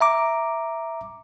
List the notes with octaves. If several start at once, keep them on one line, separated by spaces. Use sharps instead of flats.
E5 A#5 D6